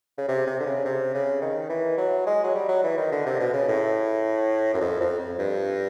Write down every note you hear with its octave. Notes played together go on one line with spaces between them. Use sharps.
C#3
C3
C3
D3
C#3
C3
C#3
D#3
E3
F#3
G#3
F#3
G3
F#3
E3
D#3
D3
C3
B2
C#3
A2
F#2
F2
F2
F2
G2